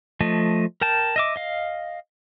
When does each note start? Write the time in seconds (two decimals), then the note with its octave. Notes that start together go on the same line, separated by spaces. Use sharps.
0.21 F3 A3 D#5
0.81 A#4 G5 A5
1.16 D#5 E5 D6
1.36 D#5 F5